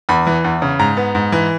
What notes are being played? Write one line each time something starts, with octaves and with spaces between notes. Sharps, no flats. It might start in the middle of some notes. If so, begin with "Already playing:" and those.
E2 B5
E3
E2
C#3
G#2 A#5
B3
G#2
E3